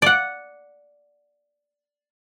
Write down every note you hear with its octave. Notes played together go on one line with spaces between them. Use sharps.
D5 F#5